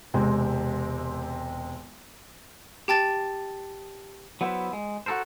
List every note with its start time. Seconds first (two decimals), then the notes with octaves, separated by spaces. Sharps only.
0.14 E1 C3 G#3 C4
2.88 G4 G5 A5 A6
4.41 F#3 B3 E4 C5 E5
4.73 G#3
5.06 F#4 G4 A4 A#4 C5